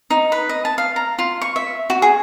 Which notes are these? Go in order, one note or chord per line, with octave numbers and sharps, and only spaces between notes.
D#4
B4
D#5
A5
F5
A#5
F4
C#6
E5
F#4
G#4